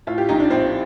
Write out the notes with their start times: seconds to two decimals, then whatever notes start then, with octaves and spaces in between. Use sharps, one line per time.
0.07 A2 F4
0.18 G4
0.29 A#1 D#4
0.40 D4
0.50 A#1 C4